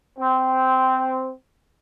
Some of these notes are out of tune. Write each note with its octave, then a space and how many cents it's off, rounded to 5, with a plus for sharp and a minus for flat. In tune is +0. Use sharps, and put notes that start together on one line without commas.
C4 -10